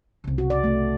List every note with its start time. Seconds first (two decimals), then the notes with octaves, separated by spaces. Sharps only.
0.24 C2 C#3
0.38 F#4
0.50 D5
0.64 A3